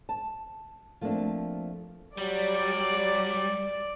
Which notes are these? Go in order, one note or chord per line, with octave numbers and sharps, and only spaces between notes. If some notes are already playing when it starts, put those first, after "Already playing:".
A5
F3 A3 A#3 C4 D4
F#3 G3 D5